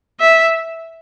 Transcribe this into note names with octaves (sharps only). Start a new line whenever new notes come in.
E5